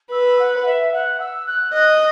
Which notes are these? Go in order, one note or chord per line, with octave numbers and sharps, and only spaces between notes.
B4 E6
F#5
E5
F#5
E6
F#6
D#5 F#6